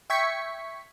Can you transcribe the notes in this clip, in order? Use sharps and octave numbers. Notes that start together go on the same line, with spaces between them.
E5 G5 C#6 G#6 B6 C#7